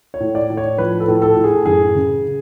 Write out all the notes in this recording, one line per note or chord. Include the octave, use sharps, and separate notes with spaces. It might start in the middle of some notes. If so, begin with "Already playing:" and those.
C#5
A2
D5
A2
C#5
F3 B4
A4
A2
A4
A2
G#4
F#2 G#4
C#3